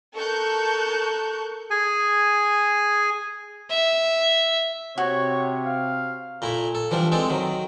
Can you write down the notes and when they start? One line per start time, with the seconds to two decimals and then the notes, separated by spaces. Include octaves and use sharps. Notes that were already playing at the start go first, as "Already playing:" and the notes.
0.16 A4 A#4 A5 C#6 F#6 G6
1.70 G#4 G#5
3.70 E5
4.98 C3 F#4 C#5
5.66 F5
6.42 A#2 A3 E4
6.75 A4
6.91 E3 F3 G3 D4
7.12 G#3 C4 A4 D5
7.30 D#3 F#3